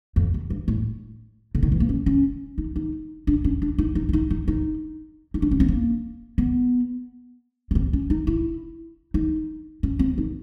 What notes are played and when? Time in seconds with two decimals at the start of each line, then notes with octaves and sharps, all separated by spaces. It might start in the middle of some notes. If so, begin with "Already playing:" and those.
0.16 F2
0.34 F#2
0.50 G2
0.68 A2
1.55 D3
1.63 D#3
1.72 E3
1.80 A#3
1.89 C#4
2.06 C#4
2.58 D#4
2.76 D#4
3.27 D4
3.44 C#4
3.62 D4
3.78 D#4
3.95 D#4
4.09 D4
4.13 D#4
4.30 D#4
4.48 D#4
5.34 D#4
5.42 D4
5.51 C#4
5.60 C4
5.68 A#3
6.38 B3
7.71 C#4
7.75 C4
7.93 C#4
8.10 D#4
8.27 E4
9.14 D#4
9.83 C#4
9.99 C4
10.18 D#4